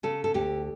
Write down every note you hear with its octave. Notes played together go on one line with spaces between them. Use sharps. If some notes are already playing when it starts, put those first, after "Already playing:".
C#3 A4
A4
D2 G4